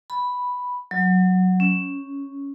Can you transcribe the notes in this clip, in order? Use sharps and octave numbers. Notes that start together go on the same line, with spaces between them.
B5
F#3
C#4